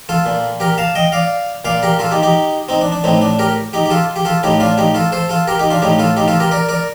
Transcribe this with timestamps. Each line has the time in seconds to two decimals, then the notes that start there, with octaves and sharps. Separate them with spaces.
0.09 F4 A4
0.26 A#2
0.60 G4 A#4
0.78 F5 A5
0.95 D#5 G5
1.12 D5 F5
1.65 A#2 D5 F5
1.83 G4 A#4
1.99 F4 A4
2.11 D#4 G4
2.23 D#4 G4
2.69 C4 D#4
2.81 D4
2.92 D4
3.04 A2 C4 D#4
3.21 D4
3.39 G4 A#4
3.73 D#4 G4
3.86 G4
3.90 F4 A4
4.16 G4
4.25 F4 A4
4.43 A2 D#4 G4
4.60 D4 F4
4.78 D#4 G4
4.95 F4 A4
5.12 A4 C5
5.29 F4 A4
5.47 G4 A#4
5.59 D#4 G4
5.70 D4 F4
5.82 A2 D#4 G4
5.99 F4 A4
6.17 D#4 G4
6.28 F4 A4
6.40 G4 A#4
6.51 A#4 D5
6.69 A#4 D5